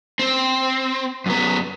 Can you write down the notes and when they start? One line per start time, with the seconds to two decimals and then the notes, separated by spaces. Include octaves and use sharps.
0.19 C4
1.26 F#2 B3